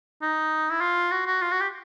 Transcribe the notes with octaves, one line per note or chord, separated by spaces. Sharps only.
D#4
E4
F4
F#4
F#4
F4
F#4
G4